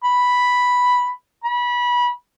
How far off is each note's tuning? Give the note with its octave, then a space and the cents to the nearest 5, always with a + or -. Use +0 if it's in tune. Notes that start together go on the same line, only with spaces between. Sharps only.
B5 +0
B5 -25